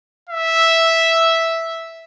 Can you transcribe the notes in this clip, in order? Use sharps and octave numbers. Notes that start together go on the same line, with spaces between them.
E5